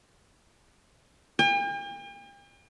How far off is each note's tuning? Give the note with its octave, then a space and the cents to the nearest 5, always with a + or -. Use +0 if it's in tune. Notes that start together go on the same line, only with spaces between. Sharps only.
G5 +45